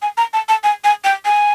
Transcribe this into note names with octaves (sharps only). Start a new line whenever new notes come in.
G#5
A#5
A5
A5
G#5
G#5
G5
G#5